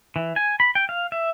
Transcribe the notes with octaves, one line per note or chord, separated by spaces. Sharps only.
E3
G#5
B5
G5
F5
E5